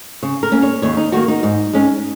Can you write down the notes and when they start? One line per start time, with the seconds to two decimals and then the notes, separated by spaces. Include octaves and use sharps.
0.23 C#3
0.43 A#4
0.52 A#3 C#4
0.62 C#5
0.82 D#2 C#5
0.97 D#4
1.12 D#3 A#3 F#4
1.28 D#4
1.43 G#2
1.73 G#3 C#4